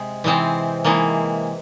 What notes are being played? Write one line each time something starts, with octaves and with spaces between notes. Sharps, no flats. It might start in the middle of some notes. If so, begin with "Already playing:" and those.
Already playing: C3 G#3
C3 E3 G#3 C4
C3 E3 G#3 A#3